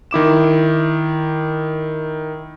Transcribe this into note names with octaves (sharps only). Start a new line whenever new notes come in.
D#3 E4 D6 E7